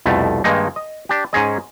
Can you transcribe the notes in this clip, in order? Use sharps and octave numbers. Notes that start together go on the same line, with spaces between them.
C2 F2 B2 A3
G2 D#3 G#3 A#3 D#4
D#5
D4 G4
G#2 C#4 G#4 D#5